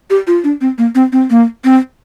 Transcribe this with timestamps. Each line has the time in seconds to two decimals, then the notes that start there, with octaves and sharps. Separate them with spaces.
0.10 G4
0.27 F4
0.44 D4
0.61 C4
0.78 A#3
0.95 C4
1.12 C4
1.30 A#3
1.64 C4